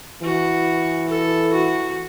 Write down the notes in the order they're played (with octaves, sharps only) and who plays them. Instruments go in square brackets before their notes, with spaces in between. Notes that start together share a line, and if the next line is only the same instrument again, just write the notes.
[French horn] E3 [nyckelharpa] F#4
[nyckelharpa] A4
F#4